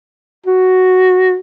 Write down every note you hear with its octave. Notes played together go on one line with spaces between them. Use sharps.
F#4